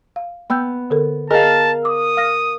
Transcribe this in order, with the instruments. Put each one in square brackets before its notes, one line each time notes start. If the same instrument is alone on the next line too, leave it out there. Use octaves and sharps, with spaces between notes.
[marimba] F5
[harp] B3 [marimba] G5 E6 G6
[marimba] D3 A4 A#4
[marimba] G#4 D#5 G#5 [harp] A#4 F5 [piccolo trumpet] A5
[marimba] D6 [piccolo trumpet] D#6
[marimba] F5 F6 A#6